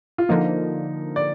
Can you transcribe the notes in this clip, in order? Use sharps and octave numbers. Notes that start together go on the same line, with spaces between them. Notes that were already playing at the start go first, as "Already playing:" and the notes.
F4
D3 F3 A#3 D#4
D5